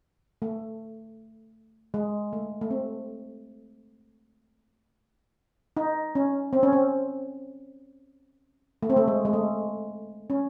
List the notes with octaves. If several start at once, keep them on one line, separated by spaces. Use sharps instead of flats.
A3
G#3
A3
A3
C4
D#4
C#4
C4
C#4
C4
A3
C4
A3
G#3
G#3
A3
C#4